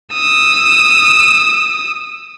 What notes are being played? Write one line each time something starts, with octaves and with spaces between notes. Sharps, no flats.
D#6 E6